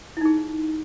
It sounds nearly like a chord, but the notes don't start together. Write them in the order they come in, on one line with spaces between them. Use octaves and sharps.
E4 D#4 G#4